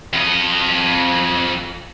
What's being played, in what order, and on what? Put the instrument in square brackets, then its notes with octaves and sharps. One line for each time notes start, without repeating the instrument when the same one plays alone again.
[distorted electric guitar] F2 D#5